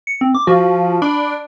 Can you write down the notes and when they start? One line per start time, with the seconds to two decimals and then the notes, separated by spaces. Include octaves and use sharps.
0.07 C#7
0.21 C4
0.35 D6
0.47 F3 F#4
1.02 D4 B5